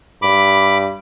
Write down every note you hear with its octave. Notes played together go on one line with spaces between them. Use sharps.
G2 B5 D6